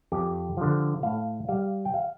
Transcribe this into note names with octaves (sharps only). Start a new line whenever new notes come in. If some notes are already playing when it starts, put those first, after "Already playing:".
F2 G4
D3 F3
A2 F5
G3 F5
G5
F5